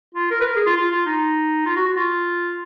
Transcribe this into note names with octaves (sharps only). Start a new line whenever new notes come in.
F4
A#4
B4
A#4
G#4
F4
F4
F4
D#4
F4
F#4
F#4
F4